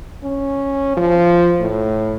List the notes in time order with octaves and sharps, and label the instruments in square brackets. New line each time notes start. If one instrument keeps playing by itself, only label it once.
[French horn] C#4
F3
A2